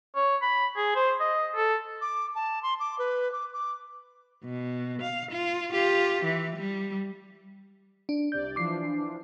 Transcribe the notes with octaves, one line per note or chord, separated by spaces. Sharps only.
C#5
B5
G#4
C5
D#5
A4
D6
A5
C6
D6
B4
D6
D6
B2
F5
F4
F4 G4
E3
G3
D4
C2 C3 D5 G6
E3 F3 D4 D6 C7